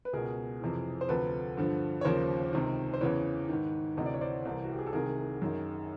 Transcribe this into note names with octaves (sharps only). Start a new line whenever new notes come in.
B4
C#2 B2 G#4 A#4
F2 C3 E3
C5
D2 C3 F3 A4 B4
G2 D3 F3
C#5
D#2 C#3 F3 A#4 C5
C#2 C3 D#3
C5
E2 C#3 E3 B4 C#5
G#2 D#3
D2 C3 E3 D#5
D5
C#5
C5 D5
C2 C3 E3
F#4
G4
G#4
A4
C2 C3 D#3 G#4 A#4
F#2 D#3